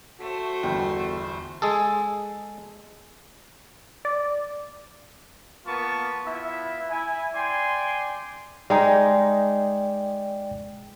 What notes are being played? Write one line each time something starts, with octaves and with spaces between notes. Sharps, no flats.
A3 F#4 A4 C5
G1 E2 G5
G#3 G#4 A4
D5
A#3 B3 F4 A#4 A5 C#6
B3 E4 F4 E5
E4 G#5
D5 G5 G#5 C6
G#3 D#4 D5 G5